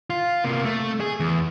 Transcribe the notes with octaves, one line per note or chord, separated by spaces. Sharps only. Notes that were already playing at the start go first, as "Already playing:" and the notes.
F4
C3 A#3
A3
G#4
E2